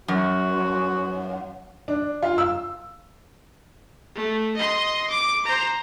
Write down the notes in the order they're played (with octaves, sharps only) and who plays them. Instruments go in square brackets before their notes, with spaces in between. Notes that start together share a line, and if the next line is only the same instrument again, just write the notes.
[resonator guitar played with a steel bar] F#2 [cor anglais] F#4
[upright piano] D4
F4
E6
[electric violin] A3
D#5 C6
D6
C5 A#5